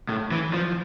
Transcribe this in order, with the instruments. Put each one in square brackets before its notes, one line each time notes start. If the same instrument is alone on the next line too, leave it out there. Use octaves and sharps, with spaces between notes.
[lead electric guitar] A2
E3
F3